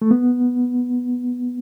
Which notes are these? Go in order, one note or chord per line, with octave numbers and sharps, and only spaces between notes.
A3
B3